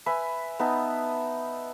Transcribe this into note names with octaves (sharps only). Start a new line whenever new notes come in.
B4 E5 G#5 B5
B3 D#4 E5 A5